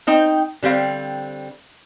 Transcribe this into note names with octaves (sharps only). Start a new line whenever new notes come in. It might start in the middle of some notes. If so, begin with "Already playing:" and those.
C4 D#4 G5
D3 G3 C4 F5